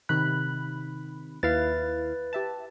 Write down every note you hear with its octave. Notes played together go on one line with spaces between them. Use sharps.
C3 D#3 B5 F#6
D#2 E4 B4 F5 A6
G4 E5 A5